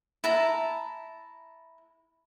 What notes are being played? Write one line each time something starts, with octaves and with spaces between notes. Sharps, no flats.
E4 A5 A#5